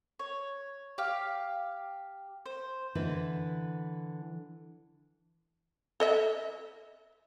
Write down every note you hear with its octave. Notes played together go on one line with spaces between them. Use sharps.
C#5
G4 F5
C5
D3 E3 E4 B4
A4 D#5 E5